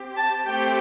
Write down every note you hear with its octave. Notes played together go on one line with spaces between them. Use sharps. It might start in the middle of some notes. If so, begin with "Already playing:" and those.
Already playing: C4 G4
A5
A3 C4 G4 G5